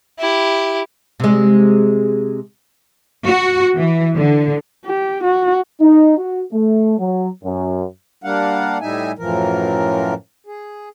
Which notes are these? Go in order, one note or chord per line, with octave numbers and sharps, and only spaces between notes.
E4 G4
C3 G#3
F#4
E3
D3
G4
F#4
D#4
F#4
A3
F#3
F#2
G3 A#3 D4 F5 F#5
A2 G3 D#4 E5 G#5
F#2 A2 E3 F3 A#4
G#4